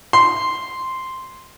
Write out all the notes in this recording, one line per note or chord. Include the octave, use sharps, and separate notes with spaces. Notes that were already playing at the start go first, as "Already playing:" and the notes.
C6